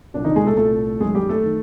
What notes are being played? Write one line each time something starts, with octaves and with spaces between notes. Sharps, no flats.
C2 A#2 D4
D#3 D#4
G#3 G#4
A3 A4
C2 A#2 A3 A4
F#2 D#3 G#3 G#4
G3 G4
A3 A4
D#3